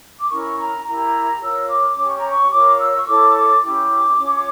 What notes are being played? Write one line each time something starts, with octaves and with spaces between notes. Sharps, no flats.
D6
C#4 E4 A#4 C#6
A#5
E4 G4 A#4 A#5
F4 A#4 C#5 E6
D6
C#4 G4 C#5 D6
C#6
A#5
C#6
F4 A#4 C#5 D6
D6
E6
C#6
E4 A4 C#5 D6
D6
C#4 E4 G4 D6
C#4 F4 C#5